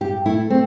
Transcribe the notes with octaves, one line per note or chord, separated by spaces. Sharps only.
G2 G4
A3 E4
A3 C4